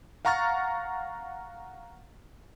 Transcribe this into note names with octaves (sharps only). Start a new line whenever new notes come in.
F5 F#5 A#5 C#6 F6 A6